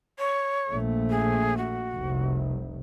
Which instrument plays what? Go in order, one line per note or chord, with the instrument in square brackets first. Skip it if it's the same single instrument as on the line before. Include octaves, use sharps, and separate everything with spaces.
[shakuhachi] C#5
[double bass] A#1 A3
[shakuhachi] G#4
F#4
[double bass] F1 C2